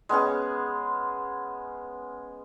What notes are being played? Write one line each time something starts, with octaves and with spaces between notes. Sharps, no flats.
G#3 B3 C#4 G#4